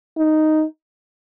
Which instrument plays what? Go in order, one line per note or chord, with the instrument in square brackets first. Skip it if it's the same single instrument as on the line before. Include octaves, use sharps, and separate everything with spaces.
[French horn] D#4